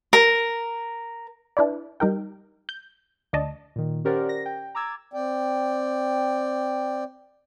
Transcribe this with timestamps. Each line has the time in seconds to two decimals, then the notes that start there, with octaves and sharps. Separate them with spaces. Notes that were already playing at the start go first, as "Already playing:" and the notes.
0.13 A#4
1.57 D4 E4 B4 D5
2.00 G3 D#4 A#4 G5
2.69 G6
3.33 D2 D5 D#5 A5
3.76 A#2 D#3
4.05 C#4 G4 A#4 C5 D5 F#5
4.29 A#6
4.46 G5
4.75 A#5 D6 E6 G#6 A6
5.13 C4 D5 G5